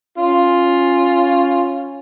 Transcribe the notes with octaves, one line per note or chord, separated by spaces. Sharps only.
C#4 F4